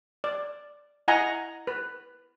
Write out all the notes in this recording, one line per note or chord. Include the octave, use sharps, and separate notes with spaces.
D5
E4 D#5 F#5 G#5 A#5
B4